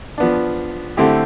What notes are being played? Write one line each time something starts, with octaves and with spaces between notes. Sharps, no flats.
F3 B3 D4
D3 A3 C4 E4 G4